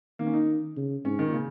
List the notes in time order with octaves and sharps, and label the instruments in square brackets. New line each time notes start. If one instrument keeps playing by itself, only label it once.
[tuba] D#3 [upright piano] A#3
[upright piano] C#4
D#4
[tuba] C#3
[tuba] G#2 [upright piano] C#4
[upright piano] D#3
A#2
C#3